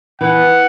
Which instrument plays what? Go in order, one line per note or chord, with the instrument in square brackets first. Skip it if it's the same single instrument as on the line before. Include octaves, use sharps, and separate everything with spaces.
[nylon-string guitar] E3 [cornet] F#5